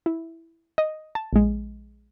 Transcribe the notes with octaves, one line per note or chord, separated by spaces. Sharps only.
E4
D#5
A5
A#1 G#3